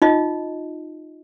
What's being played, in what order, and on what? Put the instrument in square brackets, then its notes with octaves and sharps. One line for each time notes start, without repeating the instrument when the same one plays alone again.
[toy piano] D#4 F4 D#5